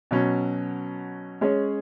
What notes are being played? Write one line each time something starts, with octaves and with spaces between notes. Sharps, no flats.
B2 F#3 C#4
G#3 C#4 G#4 C#5